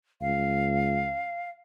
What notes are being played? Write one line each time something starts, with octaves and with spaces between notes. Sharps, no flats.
C#2 F5